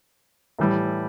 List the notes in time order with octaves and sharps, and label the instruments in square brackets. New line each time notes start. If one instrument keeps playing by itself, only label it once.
[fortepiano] A2 E3 G3